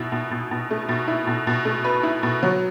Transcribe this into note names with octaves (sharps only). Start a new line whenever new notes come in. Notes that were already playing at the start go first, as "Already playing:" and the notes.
Already playing: B2 E4
B2
B2
B2
A3
B2
E4
B2
B2
A3
B4
E4
B2
F#3